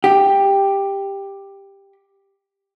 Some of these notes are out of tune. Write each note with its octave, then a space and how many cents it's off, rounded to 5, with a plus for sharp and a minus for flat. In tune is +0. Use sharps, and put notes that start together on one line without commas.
G4 +10